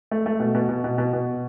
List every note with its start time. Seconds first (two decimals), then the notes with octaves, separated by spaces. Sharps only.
0.11 A3
0.26 A3
0.40 B2
0.54 B2
0.69 B2
0.84 B2
0.98 B2
1.13 B2